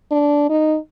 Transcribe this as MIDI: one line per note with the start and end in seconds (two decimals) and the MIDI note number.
0.11 0.49 62
0.50 0.77 63